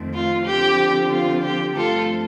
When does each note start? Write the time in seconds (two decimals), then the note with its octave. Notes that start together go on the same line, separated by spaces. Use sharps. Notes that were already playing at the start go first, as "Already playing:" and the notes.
Already playing: F2 D#3 A3 C4
0.13 F4
0.46 D3 F3 C4 G4
1.11 F4
1.44 G4
1.76 G2 F3 A3 C4 F4 A4